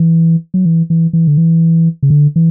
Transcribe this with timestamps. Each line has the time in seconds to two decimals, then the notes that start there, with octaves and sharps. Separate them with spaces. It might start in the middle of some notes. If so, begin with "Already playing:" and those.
Already playing: E3
0.54 F#3
0.65 E3
0.90 E3
1.13 E3
1.27 D3
1.38 E3
2.03 C#3
2.10 D3
2.36 E3